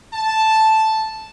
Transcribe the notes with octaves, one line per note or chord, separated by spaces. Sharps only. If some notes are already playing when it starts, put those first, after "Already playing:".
A5